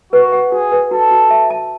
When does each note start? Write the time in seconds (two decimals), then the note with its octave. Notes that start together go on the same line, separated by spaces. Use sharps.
0.13 F#4 B4
0.32 F#5
0.52 F#4 G#4
0.72 B4
0.91 F#4 A4
1.11 F#4
1.30 E5
1.50 A5